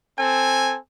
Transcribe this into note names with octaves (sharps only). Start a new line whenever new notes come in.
C4 A4 G#5